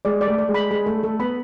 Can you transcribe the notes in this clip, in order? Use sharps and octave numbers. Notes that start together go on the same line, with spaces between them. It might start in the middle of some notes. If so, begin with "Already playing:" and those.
G#3 D5
D5
A3
D5
G#3
B5
G#3 B5
A3 A4
A3 A4
B3 B5